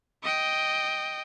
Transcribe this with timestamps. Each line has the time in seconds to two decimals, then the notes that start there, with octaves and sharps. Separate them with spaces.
0.23 D#5 G5